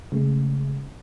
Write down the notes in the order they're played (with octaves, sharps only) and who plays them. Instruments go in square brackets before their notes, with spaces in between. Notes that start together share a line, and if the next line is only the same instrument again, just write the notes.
[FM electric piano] C#3 G#3 A3